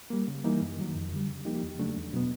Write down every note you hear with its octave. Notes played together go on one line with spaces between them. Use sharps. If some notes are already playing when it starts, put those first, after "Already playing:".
G3 A#3
C#3
E3 G3 A#3 D#4
F#2
D#3 F#3
F2
D3 G3
C#3
F3 A#3 D#4 G4
E2
C#3 F#3 A3 D4
E2
B2 F#3 B3